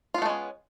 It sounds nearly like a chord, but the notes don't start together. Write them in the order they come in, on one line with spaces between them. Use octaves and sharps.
F4 B3 A3 G#3 C#4